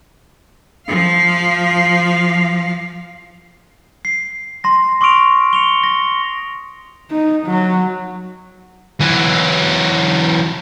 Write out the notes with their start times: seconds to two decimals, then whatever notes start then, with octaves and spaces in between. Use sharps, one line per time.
0.88 F3 F5
4.05 C7
4.64 C6 A#6
5.01 C6 C#6 D#6 F6 D7 F7
5.53 C#7 F7 G7
5.83 A#6
7.10 D#4
7.47 F#3
9.00 E3 F#3